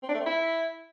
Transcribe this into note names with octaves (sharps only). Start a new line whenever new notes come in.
C4
D4
A3
C4
E4